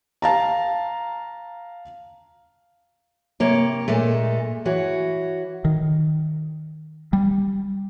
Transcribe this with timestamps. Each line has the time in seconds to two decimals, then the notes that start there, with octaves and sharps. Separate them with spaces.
0.22 F5 A5 A#5
3.40 C3 A#3 C#5
3.88 A#2 G#3 A3
4.65 E3 F#4 C#5
5.65 D#3
7.13 G3